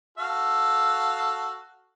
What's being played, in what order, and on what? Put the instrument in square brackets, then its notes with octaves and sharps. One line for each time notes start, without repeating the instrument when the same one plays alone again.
[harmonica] F#4 A4 F5